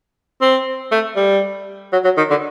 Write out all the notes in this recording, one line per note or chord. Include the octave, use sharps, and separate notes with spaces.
C4
A3
G3
F#3
F#3
D#3
D3